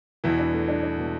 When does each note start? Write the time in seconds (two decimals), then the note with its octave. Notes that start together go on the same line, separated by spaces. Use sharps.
0.24 E2 B2 E3
0.39 D4
0.54 A3
0.68 D4
0.83 D4
0.98 B2